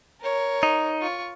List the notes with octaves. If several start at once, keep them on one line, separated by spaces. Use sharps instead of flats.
A#4 C#5
D#4
F4 C#6